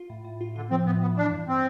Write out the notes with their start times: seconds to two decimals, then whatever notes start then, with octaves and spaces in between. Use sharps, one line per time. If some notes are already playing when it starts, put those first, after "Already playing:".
Already playing: F4
0.10 A2
0.25 A2
0.41 F4
0.56 D3 F4
0.71 F3 C4
0.86 A2 B3
1.01 A2 B3
1.17 E3 D4
1.32 G2
1.48 C4